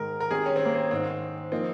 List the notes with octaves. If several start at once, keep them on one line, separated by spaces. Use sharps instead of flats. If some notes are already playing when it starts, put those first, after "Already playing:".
Already playing: G#2 D#3 G#3 A#4
A#4
D#3 G3 C4 G#4
C#4
C4
A#3
C4
G#2 D#3 G#3 C4 D#4
F3 A#3 C4 D#4